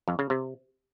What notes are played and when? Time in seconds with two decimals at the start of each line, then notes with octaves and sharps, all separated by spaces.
0.08 F2
0.19 C#3
0.30 C3